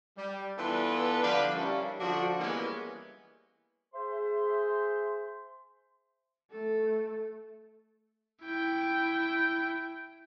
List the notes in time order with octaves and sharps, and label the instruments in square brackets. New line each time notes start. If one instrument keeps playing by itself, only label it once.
[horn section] G3
E3 B3 D4 F4 A4 B4
D3 F3 G3 D4 B4 F5
F3 G3 A#3 C#4 D4 E4
D3 F3 D4 F#4
E3 G3 G#3 A#3 B3 C#4
[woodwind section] G#4 C5 E5 C6
[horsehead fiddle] A3 A4
[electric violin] E4 G5